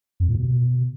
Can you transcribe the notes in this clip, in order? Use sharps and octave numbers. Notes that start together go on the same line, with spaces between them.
F2
A#2
B2